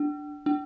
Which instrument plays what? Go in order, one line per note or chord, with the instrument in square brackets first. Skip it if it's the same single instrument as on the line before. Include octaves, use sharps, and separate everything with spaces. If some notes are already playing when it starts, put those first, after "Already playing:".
Already playing: [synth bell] D4
D4